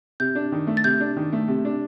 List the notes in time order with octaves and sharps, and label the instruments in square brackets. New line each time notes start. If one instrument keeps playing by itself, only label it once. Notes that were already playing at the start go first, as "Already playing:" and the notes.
[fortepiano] C3 [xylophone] G6
[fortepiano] D4
D#3
A3
[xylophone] A6
[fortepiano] C3 [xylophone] G6
[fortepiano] D4
D#3
A3
C3
D4